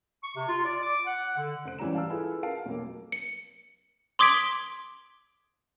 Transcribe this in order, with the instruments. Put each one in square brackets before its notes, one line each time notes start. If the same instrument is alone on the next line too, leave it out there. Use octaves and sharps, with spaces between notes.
[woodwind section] C#6
C3
F4
D5
D6
F#5
D3
[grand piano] F1 C5 F#6 D7
G#1 E3 G3 C#4 A#5 E7
F5 A5 E6 F6
E4 F4 G#4 A4 B4
A#4 F5 A5 D7
B1 F2 A3 A#3
[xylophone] C#7
C6 D6 D#6 G#6 B6 D7